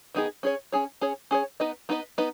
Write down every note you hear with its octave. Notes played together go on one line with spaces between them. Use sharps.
D#3 B3 D#4 G#4
C#4 G#4 C#5
C#4 G#4 C#5
C#4 G#4 C#5
C#4 G#4 C#5
B3 D#4 B4 D#5
B3 D#4 B4 D#5
B3 D#4 B4 D#5